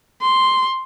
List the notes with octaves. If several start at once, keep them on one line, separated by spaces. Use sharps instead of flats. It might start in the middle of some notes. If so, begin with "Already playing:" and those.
C6